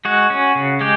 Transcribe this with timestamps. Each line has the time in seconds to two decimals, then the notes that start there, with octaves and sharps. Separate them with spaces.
0.05 G#3 F#4
0.30 C#4
0.55 C#3
0.81 G#3 G4